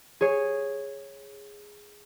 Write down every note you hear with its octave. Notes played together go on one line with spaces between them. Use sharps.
G#4 C#5